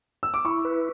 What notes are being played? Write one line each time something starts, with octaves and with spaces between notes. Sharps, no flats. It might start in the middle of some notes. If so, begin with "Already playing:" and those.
E6
D6
E4 C#6
B4